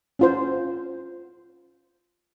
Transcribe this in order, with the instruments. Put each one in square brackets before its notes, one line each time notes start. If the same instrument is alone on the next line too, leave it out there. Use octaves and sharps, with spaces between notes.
[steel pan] C#4 F4 C5